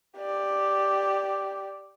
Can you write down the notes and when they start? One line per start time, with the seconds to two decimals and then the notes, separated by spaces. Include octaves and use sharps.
0.18 G4 D5